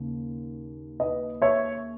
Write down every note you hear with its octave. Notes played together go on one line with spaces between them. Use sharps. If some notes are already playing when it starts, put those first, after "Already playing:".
Already playing: D#2 C#3
B4 D#5
C#5 E5